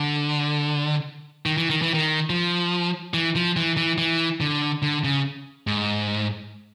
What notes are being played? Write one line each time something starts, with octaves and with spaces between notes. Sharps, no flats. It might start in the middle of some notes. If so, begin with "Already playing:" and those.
Already playing: D3
D#3
E3
D#3
E3
D#3
F3
E3
F3
E3
E3
E3
D3
D3
C#3
G#2